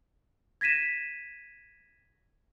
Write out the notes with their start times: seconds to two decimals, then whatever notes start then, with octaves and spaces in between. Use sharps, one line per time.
0.61 G#6 A#6 B6 D#7 E7